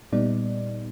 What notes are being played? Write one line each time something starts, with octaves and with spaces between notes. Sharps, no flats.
A#2 G3 B3 D#4 D5